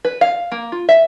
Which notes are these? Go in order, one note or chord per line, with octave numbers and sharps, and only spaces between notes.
B4
F5
A#3
F4
E5